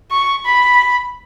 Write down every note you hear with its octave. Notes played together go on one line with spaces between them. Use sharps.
C#6
B5